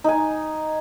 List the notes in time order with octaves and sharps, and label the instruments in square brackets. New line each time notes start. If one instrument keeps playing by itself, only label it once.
[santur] D#4 G#5